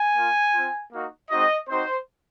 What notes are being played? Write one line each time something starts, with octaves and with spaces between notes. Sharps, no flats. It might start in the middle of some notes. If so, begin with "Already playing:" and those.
Already playing: G#5
A#3 F4
C4 F4
A#3 D#4 F#4
G#3 C4 D#4 F#4 D#5
C4 D#4 F#4 C5